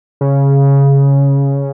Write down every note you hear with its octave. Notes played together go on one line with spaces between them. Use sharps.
C#3